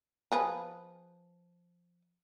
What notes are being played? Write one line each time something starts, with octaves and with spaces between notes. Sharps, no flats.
F3 G#4 B4